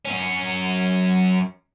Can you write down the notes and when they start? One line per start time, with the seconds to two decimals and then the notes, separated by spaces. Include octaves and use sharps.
0.05 F#2 C#4